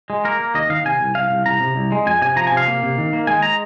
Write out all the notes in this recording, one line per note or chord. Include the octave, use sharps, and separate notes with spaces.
G#3
A#3 A#4
A#3
D#2 D#5
D#3 F5
C3 G#5
C2
C2 F5
C2
C2 A#5
C3
C2
G#3
F2 G#5
C3 G#5
F3 A#5
G#5
C3
F5
A#3
C3
D#3
A#3
G#3 G#5
A#5